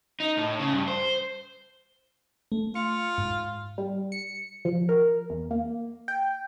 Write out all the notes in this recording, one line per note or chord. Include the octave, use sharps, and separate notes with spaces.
D#4
A2
C#3
G2
C5
A3
F4 C#7
G#2
G3
C#7
F3
A#4
E2
A#3
G5